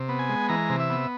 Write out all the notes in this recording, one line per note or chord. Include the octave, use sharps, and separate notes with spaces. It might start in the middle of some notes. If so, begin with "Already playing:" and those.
Already playing: C3
B3
G#5
G#3
E3 A#5
C3
E5
B3